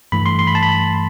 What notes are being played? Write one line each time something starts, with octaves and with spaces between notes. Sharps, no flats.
G2 E3 A3 B5
C6
C6
B5
A5
B5